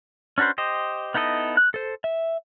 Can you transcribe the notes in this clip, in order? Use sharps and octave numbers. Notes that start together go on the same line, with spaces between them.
C#4 D4 F#4 B4 C5
G4 C5 D#5
B3 D#4 E4 A4 D#5
F#6
A4 C5
E5